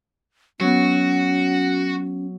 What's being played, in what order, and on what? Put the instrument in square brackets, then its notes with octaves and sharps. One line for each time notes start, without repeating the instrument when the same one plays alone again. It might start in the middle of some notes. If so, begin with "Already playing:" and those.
[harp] F#3 B3 [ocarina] C#4 [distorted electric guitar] F#4